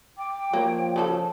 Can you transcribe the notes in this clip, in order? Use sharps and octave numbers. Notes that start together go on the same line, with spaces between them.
G5 D6
F3 A#3 C#5
C#3 C#4 A4 A5